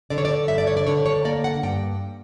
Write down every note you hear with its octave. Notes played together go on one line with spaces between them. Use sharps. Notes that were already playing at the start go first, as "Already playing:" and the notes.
D3 D5
C#5
D5
G2 E5
D5
C#5
D5
D3 C#5
C#5
A#3 D5
F#5
G2 G5